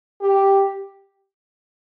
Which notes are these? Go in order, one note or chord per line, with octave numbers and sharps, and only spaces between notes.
G4